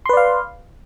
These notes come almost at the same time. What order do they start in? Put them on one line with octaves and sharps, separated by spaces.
C6 B4 D5 F5